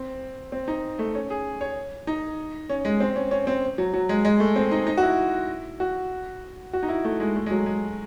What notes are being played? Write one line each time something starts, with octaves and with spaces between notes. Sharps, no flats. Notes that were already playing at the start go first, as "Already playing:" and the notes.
Already playing: C4
C4
D#4
A3
C#4
G#4
C#5
D#4
C#4
G#3
C4
C#4
C#4
C4
F#3
F#3
G#3
G#3
A3
C4
D#4
D#4
F#4
E4
F#4
F#4
D#4
E4
A3
G#3
A3
G#3
F#3
G#3